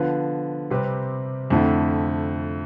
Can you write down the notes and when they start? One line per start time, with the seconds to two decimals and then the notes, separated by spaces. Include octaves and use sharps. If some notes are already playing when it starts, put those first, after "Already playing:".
Already playing: D3 F3 B3 F4 B4
0.70 C3 G3 C4 G4 B4
1.50 F2 D3 A3 E4